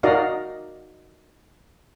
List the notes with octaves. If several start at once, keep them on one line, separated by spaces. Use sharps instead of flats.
D#4 F#4 A#4 D5 D#5 F5